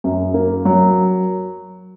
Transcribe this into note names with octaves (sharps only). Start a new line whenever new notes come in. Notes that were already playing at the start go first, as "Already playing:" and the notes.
F#2
A#3
F#3